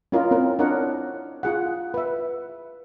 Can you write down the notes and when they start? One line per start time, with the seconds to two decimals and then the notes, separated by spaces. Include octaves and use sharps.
0.12 C#4 E4 F4 A#4 D#5
0.31 C4 C#4 A#4
0.59 D4 E4 A#4 C#5 D#5 F#5
1.43 F4 G#4 F#5
1.94 B4 E5